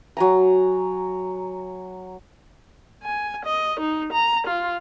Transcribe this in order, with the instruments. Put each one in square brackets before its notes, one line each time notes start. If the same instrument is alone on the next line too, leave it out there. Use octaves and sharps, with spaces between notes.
[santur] F#3 G#5 A#5
[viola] G#5
D#5
D#4
A#5
F4